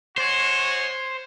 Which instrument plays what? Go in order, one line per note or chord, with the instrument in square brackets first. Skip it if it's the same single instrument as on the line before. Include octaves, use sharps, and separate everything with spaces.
[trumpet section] G#3 F#4 C#5 [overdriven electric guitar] C5